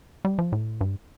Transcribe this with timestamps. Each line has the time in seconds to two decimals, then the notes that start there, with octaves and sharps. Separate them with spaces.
0.25 G3
0.39 F3
0.52 A2
0.81 G2